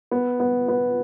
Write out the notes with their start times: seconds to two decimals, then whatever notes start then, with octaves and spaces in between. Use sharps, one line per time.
0.11 B3
0.40 B3
0.69 B3